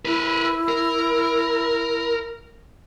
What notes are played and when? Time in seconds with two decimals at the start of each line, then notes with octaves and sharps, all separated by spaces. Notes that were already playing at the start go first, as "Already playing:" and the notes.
0.05 E4 A#4 B4
0.69 A#4